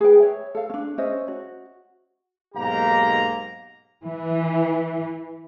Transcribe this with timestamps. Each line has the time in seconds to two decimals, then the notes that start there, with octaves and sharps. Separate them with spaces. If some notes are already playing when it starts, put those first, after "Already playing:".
0.01 G#4 B4 G5
0.20 C#5 E5
0.55 A4 F5
0.70 C#4 D4
0.98 C#4 C5 D#5 E5
1.28 F#4
2.55 B1 G#2 A#3 G4 A#5
4.03 E3